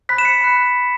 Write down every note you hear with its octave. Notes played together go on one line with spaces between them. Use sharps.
B5 F#6 B6
E7
C#7
B5 F#6